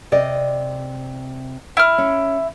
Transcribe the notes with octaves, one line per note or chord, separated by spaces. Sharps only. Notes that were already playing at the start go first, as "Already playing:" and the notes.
C3 D5 D#5
E4 F6
C#4